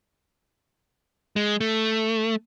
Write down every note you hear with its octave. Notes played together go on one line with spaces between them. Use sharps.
G#3
A3